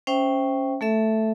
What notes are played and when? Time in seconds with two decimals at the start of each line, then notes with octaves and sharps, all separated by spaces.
0.07 C#4 C5 E5 G5
0.81 A3 A4 E5